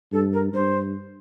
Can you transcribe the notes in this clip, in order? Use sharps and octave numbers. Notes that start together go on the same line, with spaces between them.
G2 A4
A#4
G2 C5